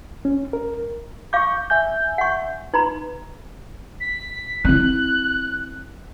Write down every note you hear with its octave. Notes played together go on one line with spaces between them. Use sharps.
C#4
A#4
F5 C#6 D6 G6
E5 G#5 G6
F#5 C#6
D#4 B4 A#5 B5
B6
C4 E4 F#6